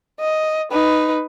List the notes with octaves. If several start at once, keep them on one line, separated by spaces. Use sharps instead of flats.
D#5
D#4 B4